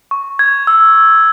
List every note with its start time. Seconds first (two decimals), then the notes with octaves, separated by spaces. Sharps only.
0.11 C#6
0.39 G#6
0.67 E6